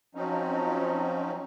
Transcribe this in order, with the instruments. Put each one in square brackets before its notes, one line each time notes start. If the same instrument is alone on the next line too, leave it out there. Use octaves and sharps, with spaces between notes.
[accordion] F3 F#3 C4 C#4 D#4